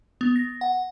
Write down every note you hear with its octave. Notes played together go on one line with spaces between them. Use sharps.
B3
A#6
F#5